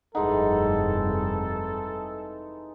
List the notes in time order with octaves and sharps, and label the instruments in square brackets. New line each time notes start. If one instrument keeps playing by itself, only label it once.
[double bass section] F1 G2 [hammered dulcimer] E3 G#3 D#4 [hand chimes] G#4 F#5 [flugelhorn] A4